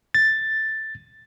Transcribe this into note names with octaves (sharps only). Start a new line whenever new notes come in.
A6